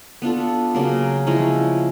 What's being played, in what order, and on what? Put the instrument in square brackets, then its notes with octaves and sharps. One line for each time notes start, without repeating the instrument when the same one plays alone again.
[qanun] B3 D4 F4 A4
C#3 F#3 A#3
F3 G#3 C#4 E4